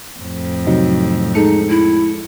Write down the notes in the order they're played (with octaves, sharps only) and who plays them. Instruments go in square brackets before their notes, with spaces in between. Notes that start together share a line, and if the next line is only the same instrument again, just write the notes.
[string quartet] F2 A2
[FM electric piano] C3 F#3 D#4
[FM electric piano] G#3 A4 C#7 [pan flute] D#4
[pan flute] E4